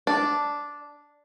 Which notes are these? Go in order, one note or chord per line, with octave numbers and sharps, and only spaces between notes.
D4